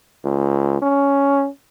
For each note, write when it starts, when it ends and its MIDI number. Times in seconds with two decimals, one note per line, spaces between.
0.24 0.80 37
0.82 1.48 61